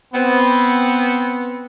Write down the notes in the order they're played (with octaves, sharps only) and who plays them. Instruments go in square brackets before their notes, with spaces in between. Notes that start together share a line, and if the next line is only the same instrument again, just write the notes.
[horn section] B3 C4